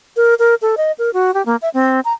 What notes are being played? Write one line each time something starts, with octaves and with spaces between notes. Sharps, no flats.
A#4
A#4
A4
D#5
A#4
F#4
G4
A#3
E5
C4
A#5